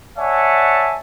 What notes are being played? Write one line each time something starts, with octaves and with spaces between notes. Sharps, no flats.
C#5 D5 E5 F#5 G#5 A5